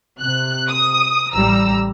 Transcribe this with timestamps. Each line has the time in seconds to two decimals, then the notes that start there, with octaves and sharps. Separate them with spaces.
0.20 C3 F#6
0.68 D#6
1.32 A1 G3 A#5 E6